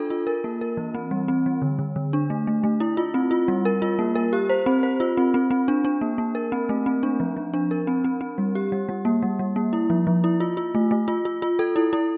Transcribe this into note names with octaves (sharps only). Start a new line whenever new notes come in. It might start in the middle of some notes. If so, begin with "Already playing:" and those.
Already playing: D4 F4 A4
F4
A#4
A#3
A#4
E3
C4
G3
C4
G3
D3
D3
D3
D4
A3
A3
A3
E4
F4
C4
F4
G3
A#4
F4
A#3
A#4
G4
C5
C4
C5
F4
C4
C4
C4
D4
D4
A#3
A#3
A#4
C4
A3
C4
D4
F3
F3
D4
A#4
C4
C4
C4
G3
G4
G3
G3
A#3
G3
G3
A#3
E4
F3
F3
E4
F4
F4
A3
A3
F4
F4
F4
A4
E4
E4